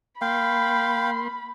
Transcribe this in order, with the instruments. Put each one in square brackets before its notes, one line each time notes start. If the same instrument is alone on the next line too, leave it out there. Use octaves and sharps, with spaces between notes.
[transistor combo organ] A#3 C6 [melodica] F5 G5 [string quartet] B5